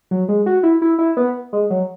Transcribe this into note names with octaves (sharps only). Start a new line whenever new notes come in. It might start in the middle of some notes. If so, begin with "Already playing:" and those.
F#3
G#3
F#4
E4
E4
E4
B3
G#3
F#3